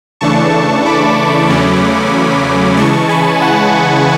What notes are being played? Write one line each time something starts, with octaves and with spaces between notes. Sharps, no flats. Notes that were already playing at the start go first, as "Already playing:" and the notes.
C#3 E3 A3 D4 A5 C#6
B5 D6
E2 C#3 F#3 A3 C#4
C#3 E3 G#3 A5 C#6
G#5 B5
F#5 A5